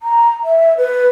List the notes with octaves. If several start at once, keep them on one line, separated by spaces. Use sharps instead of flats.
A#5
E5
B4